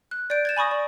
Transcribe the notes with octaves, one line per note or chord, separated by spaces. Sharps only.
F#6
D5 G6 D7
G#6 A6 E7
G#5 B5 C#6 D#6 A#6
D5